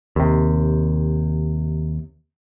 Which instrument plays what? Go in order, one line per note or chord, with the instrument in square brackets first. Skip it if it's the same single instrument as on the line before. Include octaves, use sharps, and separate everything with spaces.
[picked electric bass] D#2 C3